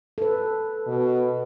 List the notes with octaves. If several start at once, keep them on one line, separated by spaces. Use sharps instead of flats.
A4 B4
B2